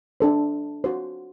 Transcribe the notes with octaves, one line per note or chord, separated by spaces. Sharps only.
D4 A4 C5
F#4 C5